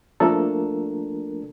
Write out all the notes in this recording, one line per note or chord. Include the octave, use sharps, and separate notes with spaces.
F3 A3 A#3 D4 A4 A#4